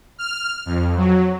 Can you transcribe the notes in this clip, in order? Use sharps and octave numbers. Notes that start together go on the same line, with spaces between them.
F6
F2
F#3